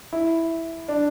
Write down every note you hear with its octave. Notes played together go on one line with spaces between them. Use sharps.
E4
D4